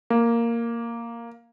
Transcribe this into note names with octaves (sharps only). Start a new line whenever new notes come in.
A#3